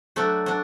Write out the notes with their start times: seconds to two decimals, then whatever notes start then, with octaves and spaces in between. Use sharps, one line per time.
0.16 F#3 A3 D4 F#4
0.46 D4 F#4